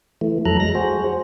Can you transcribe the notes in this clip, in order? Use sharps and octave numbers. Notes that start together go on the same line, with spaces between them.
E3 A3
F2 F#3 A4 A#5 F#6
G#3 A#6
F#4 G#4 C5